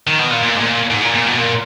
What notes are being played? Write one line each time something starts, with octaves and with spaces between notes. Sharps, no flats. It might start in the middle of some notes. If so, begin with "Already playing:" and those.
D#3
B2
A#2
A#2
G#2
A#2
G#2
A#2
A#2
B2
A#2